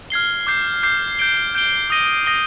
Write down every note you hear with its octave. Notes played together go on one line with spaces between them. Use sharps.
F6 G#6 C7 G7
D6 G6 C7
D6 G6 C7
G6 D7 G7
G6 D7 G7
D#6 A#6 D#7 G7
D#6 A#6 D#7 G7